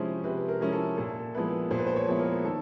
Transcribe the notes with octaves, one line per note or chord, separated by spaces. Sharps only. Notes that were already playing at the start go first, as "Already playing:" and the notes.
Already playing: C3 F3 G#3 C#4 E4 C5
C3 B4
A#4
F3 G#3 C#4 E4
A4
A#2 A4
F3 G#3 B3 E4 B4
A#2 C5
B4
C5
C#5
F3 G#3 B3 E4
A#4
D#3 A4